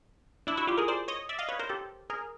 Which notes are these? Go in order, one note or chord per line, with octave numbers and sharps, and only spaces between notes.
D4 E4
E4 F#4
F4 G4
G#4 A#4
C5 D5
C#5 D#5
D5 E5
D#5 F5
B4 C#5
A#4 C5
G4 A4
G#4 A#4